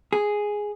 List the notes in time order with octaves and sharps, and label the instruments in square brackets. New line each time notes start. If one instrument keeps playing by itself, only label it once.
[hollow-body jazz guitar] G#4